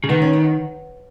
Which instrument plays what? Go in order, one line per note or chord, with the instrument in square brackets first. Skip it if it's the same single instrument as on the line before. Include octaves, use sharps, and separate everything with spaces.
[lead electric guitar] C#3
[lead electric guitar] D#3 [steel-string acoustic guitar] B3
[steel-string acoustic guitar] C#4
B3